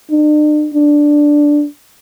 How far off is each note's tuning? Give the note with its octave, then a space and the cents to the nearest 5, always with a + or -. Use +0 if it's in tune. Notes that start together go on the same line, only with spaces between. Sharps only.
D4 +45
D4 +0